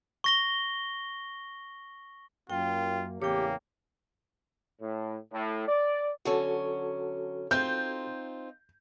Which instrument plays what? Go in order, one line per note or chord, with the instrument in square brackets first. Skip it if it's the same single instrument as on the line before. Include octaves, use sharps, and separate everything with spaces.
[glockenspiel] C#6 A#6 G7
[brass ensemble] F#2 A#3 [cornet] F4 [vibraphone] G5
[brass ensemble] E2 A2 C#3 [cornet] A#3 [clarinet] G4 [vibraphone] C#5 G5
[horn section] A2
A2
D5
[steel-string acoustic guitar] D3 F#3 C#4 [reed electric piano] F#4 A4
[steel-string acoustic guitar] C4 D#4 F4 [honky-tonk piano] G6